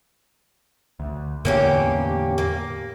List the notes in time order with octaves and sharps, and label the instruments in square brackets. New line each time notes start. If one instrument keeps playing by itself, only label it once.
[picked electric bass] D2
[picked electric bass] E2 A2 D3 [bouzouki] A#3 C#4 G4
[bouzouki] A#3